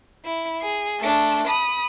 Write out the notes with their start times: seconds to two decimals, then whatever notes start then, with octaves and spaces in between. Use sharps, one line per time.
0.25 E4
0.62 G#4
1.00 A3 D4
1.47 B5 D#6